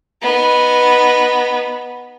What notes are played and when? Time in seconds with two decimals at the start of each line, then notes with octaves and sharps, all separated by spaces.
0.23 B3 D#4